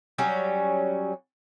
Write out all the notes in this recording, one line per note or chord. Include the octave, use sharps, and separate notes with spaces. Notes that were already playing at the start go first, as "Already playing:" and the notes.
F#3 G3 C#4